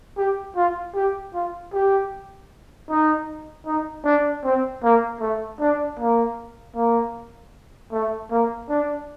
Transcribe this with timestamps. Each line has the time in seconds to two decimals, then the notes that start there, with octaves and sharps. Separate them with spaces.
0.18 G4
0.56 F4
0.95 G4
1.34 F4
1.74 G4
2.90 D#4
3.66 D#4
4.05 D4
4.44 C4
4.83 A#3
5.21 A3
5.60 D4
5.99 A#3
6.76 A#3
7.92 A3
8.31 A#3
8.69 D4